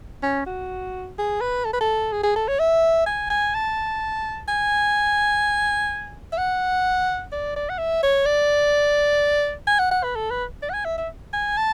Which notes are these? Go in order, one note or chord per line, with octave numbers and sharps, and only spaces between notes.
C#4
F#4
G#4
B4
A4
B4
A4
G#4
G#4
A4
C#5
E5
G#5
G#5
A5
G#5
E5
F#5
D5
D5
F#5
E5
C#5
D5
G#5
F#5
F#5
B4
A4
B4
D5
F#5
G#5
E5
E5
G#5
A5